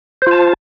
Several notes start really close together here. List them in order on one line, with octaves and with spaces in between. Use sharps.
C5 F4 A5